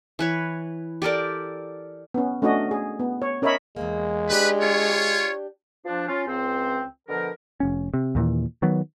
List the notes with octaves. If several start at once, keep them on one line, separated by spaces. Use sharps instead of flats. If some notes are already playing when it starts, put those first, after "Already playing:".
E3 B4 C#5
G4 A4 A#4 D5
B3 C#4
A3 C#4 D4 F#4 D#5
G#4
B3
C#5
C#4 A#4 C#5 D#5 E5 B5
E2 G2 G#3 A#3
D4 G4 B4 D5
F4 C#5
F3 D4
C#4 F4
C#2 C4 C5
B2 D3 F3 A#4
F1 C#4
C3
D#2 A#2 E3
D#3 F#3 B3